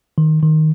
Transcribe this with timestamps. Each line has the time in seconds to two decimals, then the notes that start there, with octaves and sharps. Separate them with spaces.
0.18 D#3
0.42 D#3